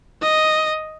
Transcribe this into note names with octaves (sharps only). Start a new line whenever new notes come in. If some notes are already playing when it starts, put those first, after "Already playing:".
D#5